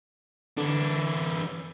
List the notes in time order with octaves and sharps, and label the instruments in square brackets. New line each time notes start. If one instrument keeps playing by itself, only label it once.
[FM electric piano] D3 [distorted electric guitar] E3 D4